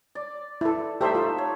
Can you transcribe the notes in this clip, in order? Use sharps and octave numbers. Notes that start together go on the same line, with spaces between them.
D5
E4 A4
G3 A3 D#4 G4 C5 E5
F4
C#5